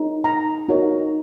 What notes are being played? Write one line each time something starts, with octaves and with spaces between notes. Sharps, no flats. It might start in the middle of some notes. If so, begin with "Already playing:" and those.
Already playing: D#4 G#4 C#5
A#5
D#4 F#4 A#4 C#5